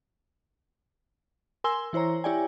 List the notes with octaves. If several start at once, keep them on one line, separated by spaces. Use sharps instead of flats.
A#4 G#5 C6 E6 G7
E3 E4 C5 C#5 A#5
E4 G4 C#5 D5 G5 G#5